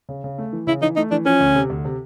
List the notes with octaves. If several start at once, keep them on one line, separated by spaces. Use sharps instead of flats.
C#3
C#3
A3
E3
C#3 E4
E3 D#4
A3 D#4
E3 D4
F3 C#4
D2
C3
D2
C3